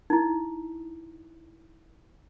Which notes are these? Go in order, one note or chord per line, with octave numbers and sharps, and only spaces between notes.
D#4 E4